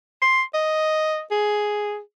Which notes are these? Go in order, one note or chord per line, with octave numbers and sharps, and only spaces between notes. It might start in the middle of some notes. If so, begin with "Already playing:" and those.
C6
D#5
G#4